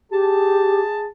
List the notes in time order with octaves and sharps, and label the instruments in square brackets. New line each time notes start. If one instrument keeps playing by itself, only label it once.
[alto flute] G4 [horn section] G#4 A5